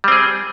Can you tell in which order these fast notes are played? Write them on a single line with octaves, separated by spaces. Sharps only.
G3 C4 G#4